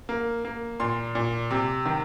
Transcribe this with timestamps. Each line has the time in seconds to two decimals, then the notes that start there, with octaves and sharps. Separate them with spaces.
0.09 A#3
0.45 A#3
0.80 A#2 C6
1.15 A#2
1.51 C3
1.86 D#3